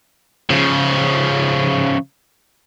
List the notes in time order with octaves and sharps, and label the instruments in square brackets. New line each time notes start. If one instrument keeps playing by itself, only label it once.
[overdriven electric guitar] C#3 F3